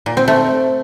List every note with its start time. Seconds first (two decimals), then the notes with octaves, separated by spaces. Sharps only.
0.06 A#2
0.17 C4
0.28 A3